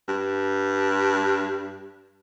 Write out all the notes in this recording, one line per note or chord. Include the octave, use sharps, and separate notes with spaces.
G2